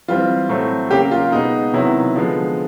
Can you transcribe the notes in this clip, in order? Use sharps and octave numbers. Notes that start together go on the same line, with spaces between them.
E3 G3 C4 F4
A2 F#3 A3 C4
C#3 F#3 A#3 G4
F4
B2 G#3 B3 D#4
C3 D#3 F#3 B3 E4
D3 F3 G#3 B3